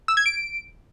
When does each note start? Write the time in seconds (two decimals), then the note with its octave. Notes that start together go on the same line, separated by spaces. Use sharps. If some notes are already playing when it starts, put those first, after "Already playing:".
0.08 E6
0.17 G#6
0.26 D7